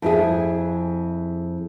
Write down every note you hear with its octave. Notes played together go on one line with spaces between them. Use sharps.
F2 E4 G#4